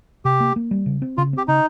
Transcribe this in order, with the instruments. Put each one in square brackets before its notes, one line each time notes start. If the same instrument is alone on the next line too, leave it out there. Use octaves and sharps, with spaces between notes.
[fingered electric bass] C3 [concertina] G4
[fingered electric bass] A#3
A#3
G3
C#3
C4
[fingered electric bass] C#3 [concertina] F4
[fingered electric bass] C4 [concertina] G4
[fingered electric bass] C#3 [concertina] D#4